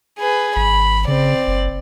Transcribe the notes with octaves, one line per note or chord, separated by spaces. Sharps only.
G#4 B4
G#1 B5
C#3 C4 D5
F#1